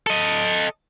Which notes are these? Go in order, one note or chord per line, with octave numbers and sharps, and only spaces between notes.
A4 D#5